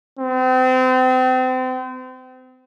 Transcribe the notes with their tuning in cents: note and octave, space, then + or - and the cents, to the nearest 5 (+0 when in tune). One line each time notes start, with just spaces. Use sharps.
C4 -35